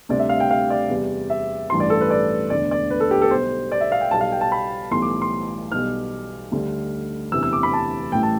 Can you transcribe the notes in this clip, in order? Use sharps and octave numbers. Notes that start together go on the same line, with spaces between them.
D2 C3 G3 D5
E5
F5
G5
F5
D5
E2 C3 G3
E5
A1 G2 E3 G3 C6
D5
A4
B4
D5
E1 D2 D3 D5
D5
B4
A4
G4
A4
B1 B2 G3 C5
D5
E5
F5
G5
B1 B2 G3 A5
F5
G5
A5
B5
B1 A2 E3 G3 C6
D6
C6
B1 B2 G3 F6
D2 D3 G3
E1 D2 C3 E3 E6
E6
D6
B5
A5
A1 A2 E3 G3 G5
A5